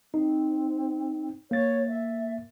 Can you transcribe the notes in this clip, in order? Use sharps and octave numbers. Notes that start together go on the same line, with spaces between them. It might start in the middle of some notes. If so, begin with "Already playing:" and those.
C4 D#4
A#3 C#5 A6
E5